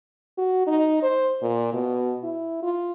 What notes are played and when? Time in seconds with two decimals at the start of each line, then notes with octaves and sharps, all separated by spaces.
0.38 F#4
0.67 D#4
1.03 C5
1.42 A#2
1.74 B2
2.24 E4
2.63 F4